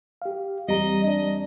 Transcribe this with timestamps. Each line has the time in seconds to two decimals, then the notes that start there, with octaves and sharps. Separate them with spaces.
0.22 G4 F5
0.69 E2 G3 C4 D#5 A#5
1.04 D4 D#5